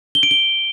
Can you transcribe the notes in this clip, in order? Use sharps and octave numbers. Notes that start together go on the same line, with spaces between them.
G7
D7
G7